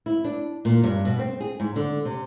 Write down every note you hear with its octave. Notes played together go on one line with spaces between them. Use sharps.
E4
D4
A#2
G2
B2
C4
G#4
G#2
D3
C3